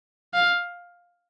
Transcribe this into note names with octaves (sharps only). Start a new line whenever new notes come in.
F5